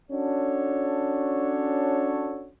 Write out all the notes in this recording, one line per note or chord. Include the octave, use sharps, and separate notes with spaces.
C#4 D4 F#4 A4 C#5